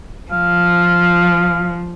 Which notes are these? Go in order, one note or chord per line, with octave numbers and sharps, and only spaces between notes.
F3 F5